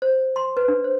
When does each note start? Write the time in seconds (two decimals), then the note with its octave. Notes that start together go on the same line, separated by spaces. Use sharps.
0.02 C5
0.36 C6
0.57 B4
0.68 D4
0.84 C5